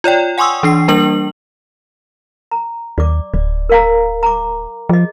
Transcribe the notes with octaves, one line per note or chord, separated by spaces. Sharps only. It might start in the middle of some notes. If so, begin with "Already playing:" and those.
F4 C#5 D5 G5
F#5 G#5 C6 C#6 D#6 E6
E3 D4 C7
G3 A#3 D4 A#4 F#7
A#5
D#2 D5 D6
D1 D5
A#4 F5 A#5
A#5 D6
F3 G#4 D#5